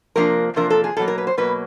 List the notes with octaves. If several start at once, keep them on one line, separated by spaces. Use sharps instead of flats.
C3 F3 A#3 D4 A#4
C3 F3 A#3 D4 A#4
A4
G#4
B2 F#3 A#3 A4
A#4
B4
C5
B2 F#3 A#3 B4